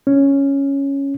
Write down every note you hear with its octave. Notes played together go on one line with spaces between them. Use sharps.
C#4